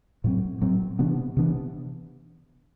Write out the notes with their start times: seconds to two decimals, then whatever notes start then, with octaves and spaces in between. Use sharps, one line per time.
0.24 A2 F#3 C4
0.62 A2 F#3 C4
0.99 C3 E3 B3 D4
1.37 C3 E3 B3 D4